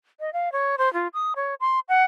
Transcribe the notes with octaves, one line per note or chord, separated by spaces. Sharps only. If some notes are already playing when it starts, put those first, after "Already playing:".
D#5
F5
C#5
C5
F4
D#6
C#5
C6
F#5